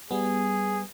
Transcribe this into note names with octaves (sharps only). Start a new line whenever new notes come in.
G3 B3 G#4